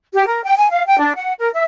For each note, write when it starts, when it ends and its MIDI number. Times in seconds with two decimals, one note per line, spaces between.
0.12 0.25 67
0.27 0.42 70
0.43 0.55 79
0.58 0.67 80
0.70 0.85 77
0.87 1.00 79
1.00 1.13 62
1.16 1.33 78
1.40 1.50 70
1.53 1.64 76